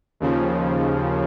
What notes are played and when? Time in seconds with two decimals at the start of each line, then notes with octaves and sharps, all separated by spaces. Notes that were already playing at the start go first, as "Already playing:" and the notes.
0.20 D#2 C#3 F3